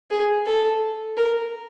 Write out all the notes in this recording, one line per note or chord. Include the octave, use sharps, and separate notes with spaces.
G#4
A4
A#4